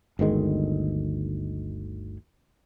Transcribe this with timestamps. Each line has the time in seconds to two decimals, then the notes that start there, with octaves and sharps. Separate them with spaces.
0.19 G1 D2 D#3 G#3